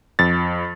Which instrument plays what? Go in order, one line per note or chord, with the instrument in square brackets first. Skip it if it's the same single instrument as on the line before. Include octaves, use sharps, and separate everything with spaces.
[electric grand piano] F2 A6